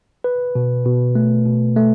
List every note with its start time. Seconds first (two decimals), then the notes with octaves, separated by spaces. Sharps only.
0.24 B4
0.55 B2
0.85 B2
1.15 A3
1.46 B2
1.76 A3